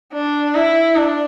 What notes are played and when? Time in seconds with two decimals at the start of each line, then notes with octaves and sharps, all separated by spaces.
0.13 D4
0.55 E4
0.96 D4